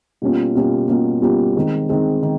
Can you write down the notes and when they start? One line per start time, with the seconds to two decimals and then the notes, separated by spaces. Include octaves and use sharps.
0.22 B2 G3 A#3 C#4 F4
0.55 B2 G3 A#3 C#4 F4
0.88 B2 G3 A#3 C#4 F4
1.22 B2 G3 A#3 C#4 F4
1.55 D#3 G#3 C4
1.89 D#3 G#3 C4
2.23 D#3 C4